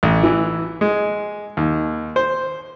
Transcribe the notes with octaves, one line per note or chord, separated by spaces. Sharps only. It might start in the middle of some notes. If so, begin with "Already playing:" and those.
A1
E3
G#3
D#2
C5